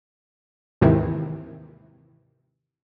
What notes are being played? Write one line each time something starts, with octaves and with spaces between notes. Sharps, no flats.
D#2 G#2 C3 D#3 E3